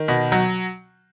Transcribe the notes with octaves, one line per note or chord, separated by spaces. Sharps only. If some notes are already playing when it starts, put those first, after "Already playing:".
Already playing: D#3
B2
F#3